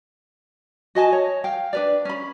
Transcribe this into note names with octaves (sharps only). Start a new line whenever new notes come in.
F#4 D#5 G#5 A5
C#5
F5 G5
D4 B4 D5
C#4 B5